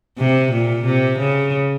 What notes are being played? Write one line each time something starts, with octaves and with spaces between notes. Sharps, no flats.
C3
A#2
C3
C#3